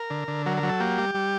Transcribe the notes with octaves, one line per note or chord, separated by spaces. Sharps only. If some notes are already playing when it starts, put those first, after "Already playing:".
Already playing: A#4
D3
D3
F#3 A#4
A#4
F#3
A4
A#3 G4
G3
G3